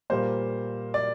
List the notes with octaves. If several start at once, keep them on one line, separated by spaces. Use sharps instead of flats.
A#2 G3 A#3 C5
D5